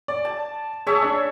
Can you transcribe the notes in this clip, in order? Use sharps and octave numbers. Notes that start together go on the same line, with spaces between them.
D5
A5
G#4 C#5 E5 A5
D4